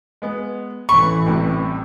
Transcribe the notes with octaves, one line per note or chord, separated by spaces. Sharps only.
G#3 B3
A1 E3 B5 C#6
A2 C3 G3